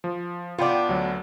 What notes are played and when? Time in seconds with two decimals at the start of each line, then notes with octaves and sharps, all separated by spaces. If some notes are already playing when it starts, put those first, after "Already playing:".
0.04 F3
0.59 B3 D4 F4 G5 D6
0.89 D2 F#3